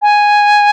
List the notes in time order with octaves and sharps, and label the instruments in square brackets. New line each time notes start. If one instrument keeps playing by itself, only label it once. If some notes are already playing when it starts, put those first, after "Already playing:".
[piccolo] G#5